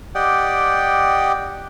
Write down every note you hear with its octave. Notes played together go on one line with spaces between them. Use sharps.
G4 D5 D#5 F#5 G5